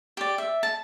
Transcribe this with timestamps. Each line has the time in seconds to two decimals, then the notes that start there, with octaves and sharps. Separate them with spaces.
0.17 G4 D5
0.38 E5
0.63 A5